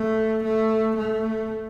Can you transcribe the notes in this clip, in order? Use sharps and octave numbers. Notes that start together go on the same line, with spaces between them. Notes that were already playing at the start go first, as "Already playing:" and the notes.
Already playing: A3
A3
A3